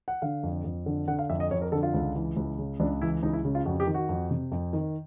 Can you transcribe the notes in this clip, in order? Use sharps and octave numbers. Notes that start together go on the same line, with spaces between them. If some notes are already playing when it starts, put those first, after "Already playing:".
F#5
D3 F5
F2
F2
D3
D3 F#5
F5
F2 E5
D#5
F2 C#5
A#4
D3 A4
F4
C#2
E3
C#2
C#3
C#2 D4
E3 E4
C#2 D#4
E4
C#3
F4
F2 F#4
G4
D#3
F#4
F2
C3
F2
D#3